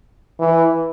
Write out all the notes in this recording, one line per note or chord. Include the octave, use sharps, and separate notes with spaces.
E3